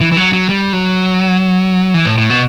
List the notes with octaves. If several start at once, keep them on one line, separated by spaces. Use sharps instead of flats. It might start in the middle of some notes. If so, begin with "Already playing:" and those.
E3
E3
F#3
F#3
G3
F#3
E3
A2
A2
B2